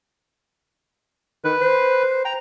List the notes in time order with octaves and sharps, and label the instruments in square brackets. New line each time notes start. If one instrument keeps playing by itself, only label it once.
[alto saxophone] D#3 [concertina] B4
[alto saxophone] C5
[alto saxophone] G5 [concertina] A#5